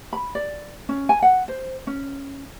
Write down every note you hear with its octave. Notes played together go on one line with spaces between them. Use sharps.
B5
D5
C#4
G#5
F#5
C5
C#4